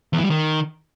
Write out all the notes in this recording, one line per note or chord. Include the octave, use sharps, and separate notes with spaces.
E2
E3
G3
D#3